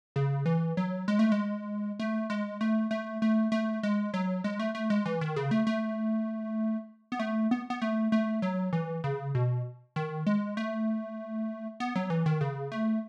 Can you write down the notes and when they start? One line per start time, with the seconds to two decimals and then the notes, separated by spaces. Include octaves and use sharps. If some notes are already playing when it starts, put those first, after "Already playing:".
0.16 C#3
0.46 E3
0.77 F#3
1.08 G#3
1.19 A3
1.32 G#3
1.99 A3
2.30 G#3
2.61 A3
2.91 A3
3.22 A3
3.52 A3
3.83 G#3
4.14 F#3
4.44 G#3
4.59 A3
4.75 A3
4.90 G#3
5.06 E3
5.21 D#3
5.36 C#3
5.51 A3
5.67 A3
7.12 B3
7.19 A3
7.51 B3
7.70 B3
7.82 A3
8.12 A3
8.42 F#3
8.73 E3
9.04 C#3
9.35 B2
9.96 D#3
10.27 G#3
10.57 A3
11.80 B3
11.96 F#3
12.10 E3
12.26 D#3
12.41 C#3
12.72 A3